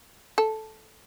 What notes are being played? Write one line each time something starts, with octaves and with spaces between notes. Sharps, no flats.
A4